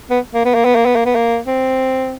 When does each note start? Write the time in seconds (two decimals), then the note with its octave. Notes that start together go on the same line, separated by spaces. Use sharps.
0.10 B3
0.34 A#3
0.45 B3
0.54 A#3
0.65 B3
0.75 A#3
0.85 B3
0.95 A#3
1.05 B3
1.15 A#3
1.47 C4